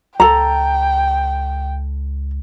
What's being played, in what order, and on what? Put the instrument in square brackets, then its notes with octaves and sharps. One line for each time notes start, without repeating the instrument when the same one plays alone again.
[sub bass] C#2 [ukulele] A4 A#5 [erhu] G5